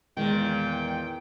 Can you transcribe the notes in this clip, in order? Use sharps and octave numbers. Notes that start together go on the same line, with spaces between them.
E2 A#2 D#3 G#3 G5